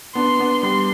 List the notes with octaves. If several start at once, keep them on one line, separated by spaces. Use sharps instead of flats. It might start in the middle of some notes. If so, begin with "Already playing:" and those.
B3 D4 C6
B3 D4
G3 B3 C6